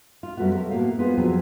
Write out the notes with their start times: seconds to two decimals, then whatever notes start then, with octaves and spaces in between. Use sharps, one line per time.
0.23 F4
0.37 F#2 G3 A3 B3 F#4
0.55 G4 A4 A#4 C#5
0.71 A2 A#3 B3 F#4 F5
0.99 B3 F4 G#4 A#4 C5
1.17 F2 A#2 F#3 B3 G#4 G5